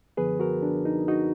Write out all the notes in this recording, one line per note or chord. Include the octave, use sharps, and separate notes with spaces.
F#2 D3 F3 B3 G#4 B4
F#4 A#4
D4
D#4
D#4 F#4